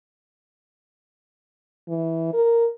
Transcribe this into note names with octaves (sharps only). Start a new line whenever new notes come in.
E3
A#4